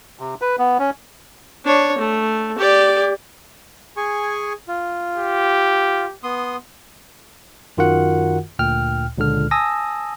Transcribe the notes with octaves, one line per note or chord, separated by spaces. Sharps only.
C3
B4
B3
C#4
D4 C#5
A3
G4 D5
G#4 G#5 C#6
F4
G4
B3 C6 D#6
F#2 D#3 F4 F#4 A#4 F#5
D2 A#2 G5 F6
C#2 A#2 D3 F6
G#5 A5 D#6 E6 A#6